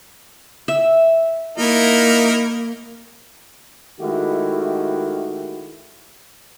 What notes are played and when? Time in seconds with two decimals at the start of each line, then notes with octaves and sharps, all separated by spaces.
0.68 E5
1.58 A#3 D#4 E4 A#4
4.01 D#3 G#3 A3 E4 F#4 G4